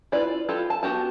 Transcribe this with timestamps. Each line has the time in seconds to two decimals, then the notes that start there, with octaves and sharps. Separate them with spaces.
0.12 E4 F4 B4 D5
0.49 E4 F4 G4 A4
0.70 A5
0.83 B3 F#4 G4 A5